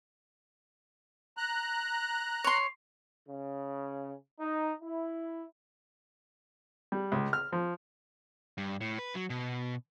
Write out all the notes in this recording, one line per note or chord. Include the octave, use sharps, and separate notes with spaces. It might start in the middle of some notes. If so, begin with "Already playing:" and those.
A#5 F#6
C#5 C6
C#3
D#4
E4
G3
C#2
F6
F3
G2
A2
B4
F#3
B2